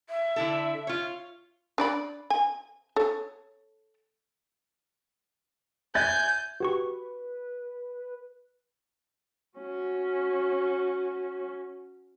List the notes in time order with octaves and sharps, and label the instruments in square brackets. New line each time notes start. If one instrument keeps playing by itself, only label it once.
[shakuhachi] E5
[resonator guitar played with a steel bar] D3 E4 A4
F4 C#5
[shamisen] D4 D5 B5
G#5
A4 C#5
[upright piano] E5 F#6 A6 [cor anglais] G#5 [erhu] G6
[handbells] F#4 G4 C#6 [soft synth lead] B4
[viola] C#4 F#4